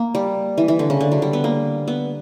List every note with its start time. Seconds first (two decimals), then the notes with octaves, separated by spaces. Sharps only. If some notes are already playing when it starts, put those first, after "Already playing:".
Already playing: A#3
0.15 G3
0.58 E3
0.68 E3
0.79 D3
0.90 C#3
1.01 D3
1.12 F#3
1.22 G3
1.33 B3
1.44 A#3
1.88 B3